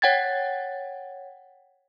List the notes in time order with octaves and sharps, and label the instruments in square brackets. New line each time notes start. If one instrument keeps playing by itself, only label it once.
[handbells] C#5 F#5 G5 G#6 A6